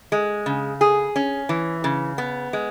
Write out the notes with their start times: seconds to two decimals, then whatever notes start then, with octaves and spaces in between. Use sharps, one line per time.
0.12 G#3
0.46 C#3
0.81 G#4
1.16 C#4
1.49 E3
1.84 C#3
2.18 B3
2.53 G#3